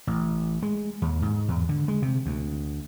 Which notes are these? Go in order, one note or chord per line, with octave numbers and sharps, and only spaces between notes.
A1
G#3
D#2
G#2
E2
D3
G#3
C3
D2